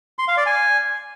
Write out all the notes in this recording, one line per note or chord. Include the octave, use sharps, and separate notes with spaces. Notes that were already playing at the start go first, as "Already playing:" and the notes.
C6
F5
D5
G#5